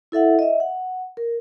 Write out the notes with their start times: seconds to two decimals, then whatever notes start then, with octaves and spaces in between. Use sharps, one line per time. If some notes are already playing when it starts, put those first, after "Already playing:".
0.12 E4 A4 E5 F#5
0.39 D#5 E5
0.60 F#5
1.17 A#4